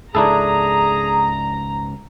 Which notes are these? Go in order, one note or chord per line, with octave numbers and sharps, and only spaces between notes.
C#2 G#2 D4 E4 G#4 A4 A#5